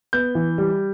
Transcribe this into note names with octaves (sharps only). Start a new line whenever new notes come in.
B3 G6
E3
G3